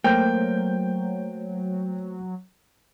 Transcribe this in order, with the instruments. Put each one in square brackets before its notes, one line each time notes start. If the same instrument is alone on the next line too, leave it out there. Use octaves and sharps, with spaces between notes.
[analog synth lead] F#3 [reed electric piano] A3 C5 G6 [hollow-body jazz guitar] A#3 [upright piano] G5